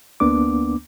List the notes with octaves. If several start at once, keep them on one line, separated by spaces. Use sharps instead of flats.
D2 A#3 B3 D4 D6